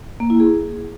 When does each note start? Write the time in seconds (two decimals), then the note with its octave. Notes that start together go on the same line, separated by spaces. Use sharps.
0.20 A#3
0.30 E4
0.40 G#4